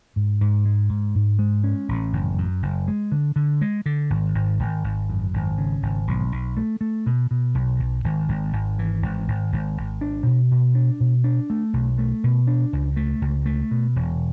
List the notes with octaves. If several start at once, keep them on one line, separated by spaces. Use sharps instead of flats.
G#2
G#2
G#3
G#2
G#2
G#3
C#4
A1
F#1
F#2
F#1
G#3
D3
D3
G#3
D3
G#1
G#1
G#1
G#1
F#2
G#1
C#3
G#1
B1
B1
A3
A3
B2
B2
B1
B1
G#1
G#1
G#1
E3
G#1
G#1
G#1
G#1
D4
B2
B2
D4
B2
D4
A3
B1
A3
B2
D4
C#2
A3
C#2
A3
B2
E1